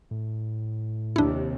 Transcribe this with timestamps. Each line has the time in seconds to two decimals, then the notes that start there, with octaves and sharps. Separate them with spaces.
0.11 A2
1.16 D#2 C3 D4 E4